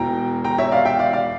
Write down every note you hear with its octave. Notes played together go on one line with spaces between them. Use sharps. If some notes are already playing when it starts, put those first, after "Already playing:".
Already playing: E1 E2 E3 G5 A#5
G5 A#5
C#5 E5
D5 F5
E5 G5
D5 F5
D5 F5